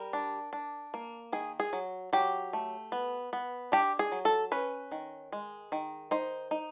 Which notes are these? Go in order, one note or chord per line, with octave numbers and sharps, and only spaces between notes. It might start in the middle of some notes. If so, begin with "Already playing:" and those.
Already playing: G3 A#4
D4
D4
A#3
D#3 G#4
G#4
F#3
F#3 G4
A3
B3
B3
D4 G4
G#4
F#3
A4
C#4 B4
D#3
G#3
D#3
D#4 C5
D#4